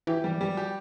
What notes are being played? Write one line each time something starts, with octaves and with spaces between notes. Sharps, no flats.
E3 G4
G3
G3
G4